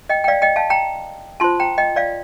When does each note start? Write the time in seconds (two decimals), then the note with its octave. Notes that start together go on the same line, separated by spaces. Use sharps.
0.09 D#5 G5
0.24 G5
0.28 D5 F5
0.42 D#5 G5
0.56 F5 A5
0.70 G5 A#5
1.40 F4 C5 A5 C6
1.60 G5 A#5
1.78 D#5 G5
1.96 D5 F5